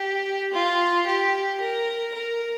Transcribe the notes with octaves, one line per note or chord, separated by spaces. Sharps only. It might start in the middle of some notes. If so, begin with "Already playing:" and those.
Already playing: G4
F4
G4
A#4
A#4